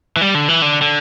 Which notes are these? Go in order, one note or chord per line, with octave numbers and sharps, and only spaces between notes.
E3
G3
D3
E3
D3
D3